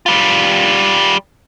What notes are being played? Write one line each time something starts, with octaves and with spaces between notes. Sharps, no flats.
G3 F4